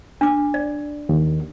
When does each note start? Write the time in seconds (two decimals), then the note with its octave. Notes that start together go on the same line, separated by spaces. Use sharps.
0.21 D4 D6
0.54 D5
1.09 D#2